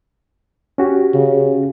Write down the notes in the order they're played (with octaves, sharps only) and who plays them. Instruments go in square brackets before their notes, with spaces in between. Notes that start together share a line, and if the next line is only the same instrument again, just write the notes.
[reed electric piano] C#4 F#4 G4
[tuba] C#3